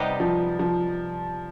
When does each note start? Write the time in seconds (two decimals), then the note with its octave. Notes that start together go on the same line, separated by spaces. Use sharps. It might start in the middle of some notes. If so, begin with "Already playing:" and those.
Already playing: C3 G3 B3 D#4 G4
0.20 F3
0.59 F3